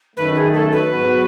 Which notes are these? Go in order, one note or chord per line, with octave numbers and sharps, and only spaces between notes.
F#2 D#3 A3 B4
G#4
A4
B4
G#2 F#3 B3 F#4